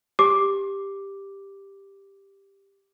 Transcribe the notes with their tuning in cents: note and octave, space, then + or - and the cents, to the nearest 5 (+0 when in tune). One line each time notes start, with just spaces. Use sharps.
G4 +10 D6 +0